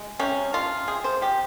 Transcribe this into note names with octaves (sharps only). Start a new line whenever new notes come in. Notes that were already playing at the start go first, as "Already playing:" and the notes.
Already playing: G#3
C3 C#4
F3 F4
C3 G#4
C5
F3 G4